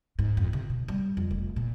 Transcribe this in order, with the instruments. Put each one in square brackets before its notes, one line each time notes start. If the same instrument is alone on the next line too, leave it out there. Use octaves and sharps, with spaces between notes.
[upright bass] G#2
F2
C3
B2
G3
F2
F1
A#2